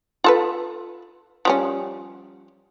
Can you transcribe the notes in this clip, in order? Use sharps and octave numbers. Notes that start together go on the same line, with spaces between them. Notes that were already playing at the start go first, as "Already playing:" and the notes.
F4 A4 B4
F3 G3 C#4